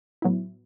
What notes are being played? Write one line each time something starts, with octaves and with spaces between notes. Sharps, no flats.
A2 F#3 B3 E4